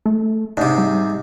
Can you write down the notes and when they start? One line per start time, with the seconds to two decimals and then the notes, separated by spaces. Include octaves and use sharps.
0.06 A3
0.57 G#2 C3 D4
0.78 G3